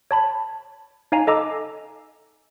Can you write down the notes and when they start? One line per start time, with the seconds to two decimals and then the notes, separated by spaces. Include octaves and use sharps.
0.11 C#5 A5 B5
1.12 D#4 C#5 F5 G#5 A#5
1.27 A4 D#5 A#5 D6 E6